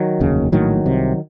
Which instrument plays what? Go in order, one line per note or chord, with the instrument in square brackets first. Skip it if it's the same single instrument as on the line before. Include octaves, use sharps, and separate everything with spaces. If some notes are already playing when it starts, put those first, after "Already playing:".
Already playing: [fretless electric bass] D#3 F#3
F1 D#2 C#3
A#1 A2 D#3 F#3
C2 C3